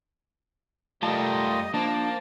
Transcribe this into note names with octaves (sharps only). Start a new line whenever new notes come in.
G3 A3 F4 A#4 D#5 A5
F3 A#3 D4 A5